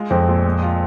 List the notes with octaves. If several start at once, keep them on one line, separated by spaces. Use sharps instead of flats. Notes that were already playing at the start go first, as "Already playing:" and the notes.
Already playing: G#3 F4
F2 C4
A#2
G#3
F4